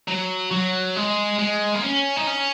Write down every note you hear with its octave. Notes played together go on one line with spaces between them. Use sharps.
F#3
F#3
G#3
G#3
A#3
C#4
D#4
C#4